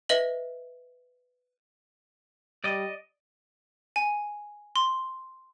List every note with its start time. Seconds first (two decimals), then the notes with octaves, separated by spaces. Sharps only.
0.09 B4 D#5 E5 F#7
2.64 G3 D5 D#5
3.96 G#5
4.76 C6